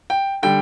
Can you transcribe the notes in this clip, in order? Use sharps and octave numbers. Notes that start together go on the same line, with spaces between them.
G5
D3 G3 G5